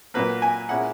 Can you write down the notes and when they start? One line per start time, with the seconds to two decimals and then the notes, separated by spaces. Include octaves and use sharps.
0.14 A#2 F#3 A#3 B4
0.42 G#5
0.69 A#2 G#3 C#4 E4 F#5